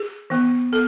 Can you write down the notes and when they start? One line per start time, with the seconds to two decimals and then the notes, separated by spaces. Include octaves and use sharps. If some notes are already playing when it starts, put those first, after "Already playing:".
Already playing: G#4
0.30 E3 B3
0.72 B3 A4